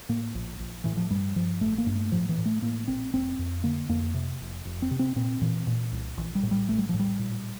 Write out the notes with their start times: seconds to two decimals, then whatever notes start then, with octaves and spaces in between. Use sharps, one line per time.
0.09 A2 A#3
0.35 A#1
0.60 A#1
0.84 A2 E3
0.97 F3
1.11 G2 G3
1.36 G2 F3
1.61 A1 A3
1.78 A#3
1.86 G2
1.95 A3
2.12 A2 F3
2.29 E3
2.38 A2
2.45 A3
2.62 A2 A#3
2.88 A#1 C4
3.13 F1 C4
3.39 F2
3.64 D3 A#3
3.89 F2 A#3
4.14 C3
4.40 F1
4.65 F1
4.82 C4
4.91 C3
4.99 C4
5.16 A#2 C4
5.41 A#2 E3
5.67 A#2
5.92 C2
6.17 A#1 E3
6.35 G3
6.43 A2
6.51 G3
6.69 A#1 A3
6.78 G3
6.89 A2 F3
6.99 G3
7.19 A#2